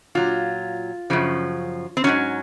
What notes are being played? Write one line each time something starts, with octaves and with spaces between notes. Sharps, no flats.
A#2 F#3 F4
F#2 C#3 F3
C4
G#2 D#3 F#3 C#4